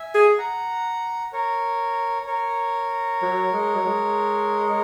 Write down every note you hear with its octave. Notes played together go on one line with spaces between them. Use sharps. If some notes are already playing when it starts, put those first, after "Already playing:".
Already playing: E5 G#5
G#4
F#5 A#5
A#4 C#5
A#4 C#5
F#3
G#3
F#3
G#3